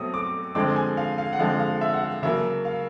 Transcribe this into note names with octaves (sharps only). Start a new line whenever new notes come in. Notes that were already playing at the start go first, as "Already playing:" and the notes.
Already playing: B2 F#3 A3 C4 D#6
D6
D3 F3 G#3 C4 D6
G#5
F5
F5
F#5
D3 F3 G#3 C4 F5
F5
E5
F#5
F5
C#3 F#3 A#3 E5
F5